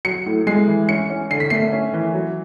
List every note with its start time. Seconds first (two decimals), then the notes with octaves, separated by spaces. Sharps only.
0.05 F#3 C#7
0.26 A2
0.47 G#3 C7
0.68 E3
0.89 C#4 C#7
1.10 C#4
1.31 D3 C7
1.40 B6
1.50 A3 C7
1.72 C#4
1.93 E3
2.14 F#3